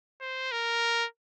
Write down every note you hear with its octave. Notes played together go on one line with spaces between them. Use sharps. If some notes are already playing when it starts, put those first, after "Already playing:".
C5
A#4